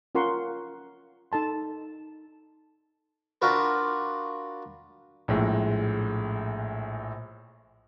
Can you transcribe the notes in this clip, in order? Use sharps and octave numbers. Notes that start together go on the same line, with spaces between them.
C#4 F4 A#4 F#5 C6 C#6
D#4 A4 A5 C6
D4 F4 F#4 A#4 B4
A#1 A2 G#3